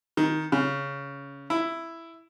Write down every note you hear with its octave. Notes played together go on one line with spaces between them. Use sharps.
D#3
C#3
E4